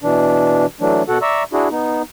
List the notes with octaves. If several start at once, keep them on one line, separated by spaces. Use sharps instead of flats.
B2 E3 D4
E3 F#3 A3 D4
B2 F#4 A4 F#5
D5 E5 A#5 C#6 E6
D4 E4 F#4 G#4
B3 D#4